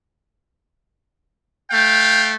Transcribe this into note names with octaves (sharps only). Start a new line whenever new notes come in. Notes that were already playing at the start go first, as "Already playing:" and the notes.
A3 F5 G5